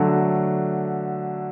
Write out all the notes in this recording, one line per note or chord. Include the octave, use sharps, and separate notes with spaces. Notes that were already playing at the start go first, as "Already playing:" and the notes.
Already playing: D3 F#3 A3